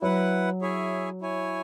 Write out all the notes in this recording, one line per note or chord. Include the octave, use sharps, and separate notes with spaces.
F#3 E4 B4 F#5
E4 G#4 C#5 E5 G#5
E4 C#5 G#5